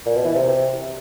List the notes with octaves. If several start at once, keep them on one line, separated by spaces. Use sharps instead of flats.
A#2
B2
E3
C3